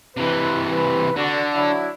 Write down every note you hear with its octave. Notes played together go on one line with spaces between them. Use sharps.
C3 E3 B4
B4
D3 D4 F#4
F#3 D4 E4